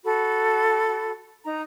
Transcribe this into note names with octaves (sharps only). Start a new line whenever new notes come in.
F#4 A4 B5
D#4 A#5